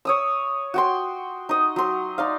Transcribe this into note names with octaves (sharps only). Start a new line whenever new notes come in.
C#5 D#6 E6
F#4 G5 C6
D#4 D#5
F#3 C6
D#4 D5 F5